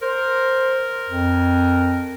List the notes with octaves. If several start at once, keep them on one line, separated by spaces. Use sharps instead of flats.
A#4 C5
F2